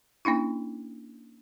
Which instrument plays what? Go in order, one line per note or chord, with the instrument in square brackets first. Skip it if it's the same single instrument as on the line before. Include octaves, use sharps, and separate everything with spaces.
[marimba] A#3 C#4 D4 E4